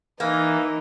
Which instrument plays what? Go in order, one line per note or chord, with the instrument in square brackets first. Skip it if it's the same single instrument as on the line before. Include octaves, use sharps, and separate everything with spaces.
[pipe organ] E3 [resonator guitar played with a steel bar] A#3 [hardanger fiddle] D#4